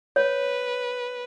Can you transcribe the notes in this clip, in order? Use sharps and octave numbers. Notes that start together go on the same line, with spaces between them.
B4 C#5